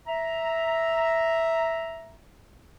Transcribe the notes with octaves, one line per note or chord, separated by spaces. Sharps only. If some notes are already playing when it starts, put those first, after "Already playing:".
E5 A#5